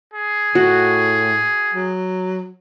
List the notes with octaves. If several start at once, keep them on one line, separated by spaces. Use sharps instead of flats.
G#4
A2 F#4
F#3